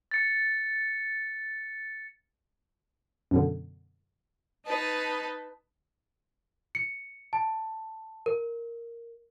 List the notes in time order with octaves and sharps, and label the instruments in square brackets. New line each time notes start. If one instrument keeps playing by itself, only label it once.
[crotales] A6 C#7
[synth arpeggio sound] F#2 B2 D3
[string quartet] D#4 B4 A5
[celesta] C#7
A5
A#4